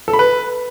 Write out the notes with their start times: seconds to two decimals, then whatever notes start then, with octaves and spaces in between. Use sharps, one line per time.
0.08 A4
0.13 B5
0.19 B4